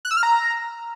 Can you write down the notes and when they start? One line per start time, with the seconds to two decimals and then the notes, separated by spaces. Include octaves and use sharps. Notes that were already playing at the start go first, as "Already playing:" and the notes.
0.05 F#6
0.11 E6
0.17 F6
0.23 A#5